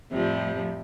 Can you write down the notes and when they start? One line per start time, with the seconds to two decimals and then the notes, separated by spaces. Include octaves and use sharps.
0.10 F2 A2 C3 F3 G3